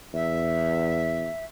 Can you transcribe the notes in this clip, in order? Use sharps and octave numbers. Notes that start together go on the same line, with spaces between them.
E2 E5